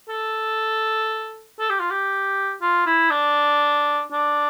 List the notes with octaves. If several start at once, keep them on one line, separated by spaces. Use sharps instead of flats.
A4
A4
G4
F4
G4
F4
E4
D4
D4